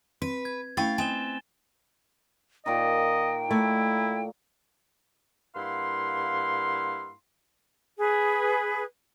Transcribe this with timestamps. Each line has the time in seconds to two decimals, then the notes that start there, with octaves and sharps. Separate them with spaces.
0.22 C4 B4
0.45 G#6
0.77 A3 C#4 E4 F5 G5 B5 C#6 A6
0.98 C4 D#4 B4 G5 G#5 E7 G7
2.66 A#2 D#3 D#5 G5
3.51 A3 E4
5.56 G2 A#3 E4 F5 F#5 C6
7.98 G#4 B4